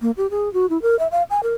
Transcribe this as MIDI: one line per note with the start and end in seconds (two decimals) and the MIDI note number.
0.02 0.11 58
0.17 0.30 67
0.31 0.52 68
0.54 0.66 66
0.70 0.81 64
0.82 0.98 70
0.99 1.07 76
1.12 1.23 77
1.30 1.41 80
1.43 1.54 70